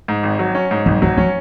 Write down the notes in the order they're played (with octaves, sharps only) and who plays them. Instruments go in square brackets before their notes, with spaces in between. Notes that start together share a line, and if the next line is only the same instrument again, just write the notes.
[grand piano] G#2
G#1
F#3
C#4
G#2
[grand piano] G#1 [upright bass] F#3
[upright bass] F3 [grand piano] F#3
[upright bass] F3 [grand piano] C#4